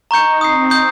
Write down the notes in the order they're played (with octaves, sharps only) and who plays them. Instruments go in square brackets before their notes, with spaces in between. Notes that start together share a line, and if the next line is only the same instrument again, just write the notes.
[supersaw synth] D#4 [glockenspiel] A#5 C#6 G6 C#7
[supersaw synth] C4 [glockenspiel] D#6 G6 C7
[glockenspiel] D#6 G6 C7